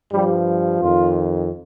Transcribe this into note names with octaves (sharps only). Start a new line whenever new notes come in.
G2 F3 G3
F2 D#3 F4